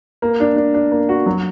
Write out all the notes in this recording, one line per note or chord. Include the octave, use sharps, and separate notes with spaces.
A#3
D4
D4
D4
A#3
F#4
F#3